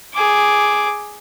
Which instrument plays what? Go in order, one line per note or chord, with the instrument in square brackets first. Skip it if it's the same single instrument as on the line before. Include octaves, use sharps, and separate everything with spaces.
[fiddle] G#4 D6